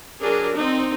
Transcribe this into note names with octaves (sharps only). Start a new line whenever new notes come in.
F#3 D4 G#4 A#4
C4 D#4